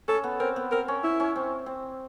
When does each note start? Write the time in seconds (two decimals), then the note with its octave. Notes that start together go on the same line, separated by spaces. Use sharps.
0.08 C#4 A4
0.24 B3
0.40 C4 A#4
0.56 B3
0.71 C4 A#4
0.88 C#4
1.04 E4
1.20 C#4
1.36 C4
1.66 C4